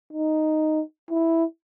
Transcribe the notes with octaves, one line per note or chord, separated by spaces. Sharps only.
D#4
E4